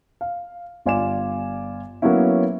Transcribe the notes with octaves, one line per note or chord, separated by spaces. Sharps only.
F5
G1 F4 D5 G#5 D6 E7
F#3 A#3 B3 C#4 E4